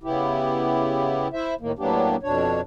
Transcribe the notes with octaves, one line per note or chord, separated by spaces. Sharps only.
C#3 B3 E4 G4
E4 C5 E5
A2 D#3 A#3
A2 F#3 A#3 B3 D4 G4
F2 B2 D4 C#5